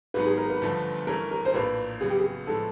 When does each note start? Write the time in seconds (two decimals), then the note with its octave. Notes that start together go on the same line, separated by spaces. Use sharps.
0.14 G#1 G#2 D#3 F#3 B3 B4
0.26 G#4
0.37 A#4
0.49 B4
0.61 G1 G2 D3 F3 A3
1.07 G2 E3 A3 C#4 A#4
1.31 A#4
1.45 C5
1.54 A#1 A2 F3 A#3 B4
2.00 F#2 C#3 F#3 B3 G#4
2.10 G4
2.19 G#4
2.46 A2 F3 G#3 B3 A4